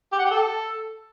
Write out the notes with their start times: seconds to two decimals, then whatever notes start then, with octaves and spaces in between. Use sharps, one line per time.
0.13 G4
0.19 F#5
0.25 G4
0.31 A4